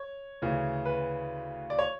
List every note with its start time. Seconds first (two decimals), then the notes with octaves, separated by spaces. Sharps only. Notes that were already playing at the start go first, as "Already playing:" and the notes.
Already playing: C#5
0.42 D2 C#3 E3
0.85 B4
1.70 D5
1.79 C#5